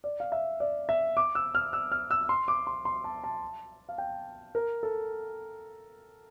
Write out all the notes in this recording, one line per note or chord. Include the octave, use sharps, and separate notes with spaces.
D5
F5
E5
D5
E5
D6
E6
F6
E6
F6
E6
C6
D6
C6
C6
A5
A5
F5
G5
A#4
A4